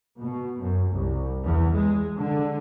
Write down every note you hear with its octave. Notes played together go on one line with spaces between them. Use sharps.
B2
F#2
C2
E2
G#3
D3